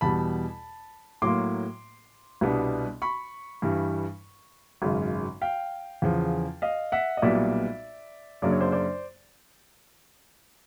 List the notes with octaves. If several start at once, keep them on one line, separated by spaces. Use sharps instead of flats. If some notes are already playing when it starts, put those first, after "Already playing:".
E2 B2 G3 A5 B5
A2 F#3 A#3 C6 D6
C2 B2 G3 B3 D4
B5 C#6
G2 E3 G3
G#1 F#2 C#3
F5 G5
E2 C#3 F3
D#5 F5
E5 F#5
D#5
B1 A#2 G3 B3 D5 E5
F#2 C#3 F#3 A#3 D4 D5
C#5
C5 D5
C5 D5